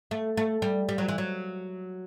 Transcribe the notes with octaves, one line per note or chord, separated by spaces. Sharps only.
A3
A3
G3
G3
F#3
E3
F#3